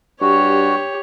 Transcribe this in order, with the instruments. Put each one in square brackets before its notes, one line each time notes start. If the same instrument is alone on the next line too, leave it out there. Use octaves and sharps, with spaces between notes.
[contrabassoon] G2 [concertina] F#4 [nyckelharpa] G4 C#5